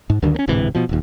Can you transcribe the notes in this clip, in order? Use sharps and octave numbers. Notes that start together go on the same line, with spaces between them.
G#2
D2 G2 D3 D#3
A#3 C#4
D1 G#2 C3 E3
B2 F3
D#1 D#2